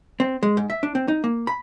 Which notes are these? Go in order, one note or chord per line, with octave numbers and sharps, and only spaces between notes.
C4
G#3
G#2
E5
D4
C4
D#4
A#3
B5